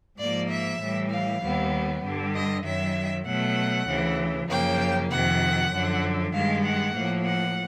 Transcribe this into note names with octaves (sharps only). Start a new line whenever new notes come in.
G#2 F3 A#3 D5
E5
A2 E3 G3
F5
D#2 D#3 G3 B3
G2 D3 G3
D#5
F#2 D#3 F#3 E5
B2 F#3 A3 F#5
D2 C#3 E3
F#2 C#3 F3 A#3 G5
F2 C3 D#3 F#5
F#2 D3 F3
G2 D#3 G#3 F5
F#5
A2 F3 A#3
F#5